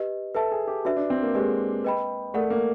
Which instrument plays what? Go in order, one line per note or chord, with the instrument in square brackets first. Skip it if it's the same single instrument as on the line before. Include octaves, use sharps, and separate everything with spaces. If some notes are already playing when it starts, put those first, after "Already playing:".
Already playing: [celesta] G4 B4 D#5
[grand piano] A4 [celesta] B4 E5 A5
[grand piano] G#4
G4
[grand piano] D4 [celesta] F#4 B4 E5
[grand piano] D4
C4
A#3
[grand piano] G#3 [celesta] G4 B4 D#5
[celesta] B4 D#5 G5 B5
[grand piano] A3 [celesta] A#4 D5 F#5
[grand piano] A#3